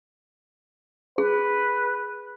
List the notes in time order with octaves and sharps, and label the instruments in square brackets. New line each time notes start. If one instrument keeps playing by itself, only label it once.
[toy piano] G#4 [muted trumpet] B4